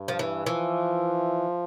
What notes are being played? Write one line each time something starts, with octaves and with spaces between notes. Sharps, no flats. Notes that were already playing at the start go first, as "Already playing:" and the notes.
Already playing: G2
F3
E3
E3 F3